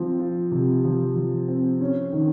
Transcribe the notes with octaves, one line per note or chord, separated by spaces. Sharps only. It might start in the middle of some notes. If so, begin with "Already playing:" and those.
Already playing: F3 C4
F4
C3
F3
F3
C4
C#4
D#3